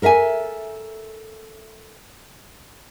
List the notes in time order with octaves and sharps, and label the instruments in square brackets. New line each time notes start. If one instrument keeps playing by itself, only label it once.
[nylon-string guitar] A4 A#4 E5 F5 G#5